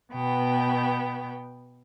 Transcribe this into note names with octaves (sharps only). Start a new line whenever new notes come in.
B2 B3 G5